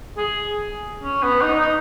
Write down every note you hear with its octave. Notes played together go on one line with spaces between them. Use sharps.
G#4
C#4
B3
D#4
D#4